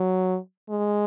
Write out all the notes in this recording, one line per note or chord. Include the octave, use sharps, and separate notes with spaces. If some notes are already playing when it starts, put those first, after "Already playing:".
Already playing: F#3
G#3